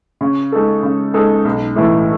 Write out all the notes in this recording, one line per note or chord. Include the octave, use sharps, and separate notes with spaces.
C#3
G#3 D#4 A4
C#3
G#3 D#4 A4
B1
A2 E3 A3 E4